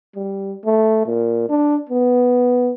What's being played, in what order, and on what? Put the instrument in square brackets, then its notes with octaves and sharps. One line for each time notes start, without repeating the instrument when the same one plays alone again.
[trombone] G3
A3
A#2
D4
B3